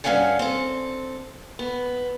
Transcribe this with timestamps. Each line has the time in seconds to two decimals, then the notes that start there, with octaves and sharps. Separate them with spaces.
0.04 G2 G#3 C#4 F5 F#5 G#5
0.39 C4 A4
1.59 B3